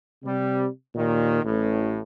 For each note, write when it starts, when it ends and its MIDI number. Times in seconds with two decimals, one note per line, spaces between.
0.24 0.67 48
0.24 0.67 55
0.95 1.40 39
0.95 1.40 46
0.95 1.40 51
1.44 1.99 33
1.44 1.99 45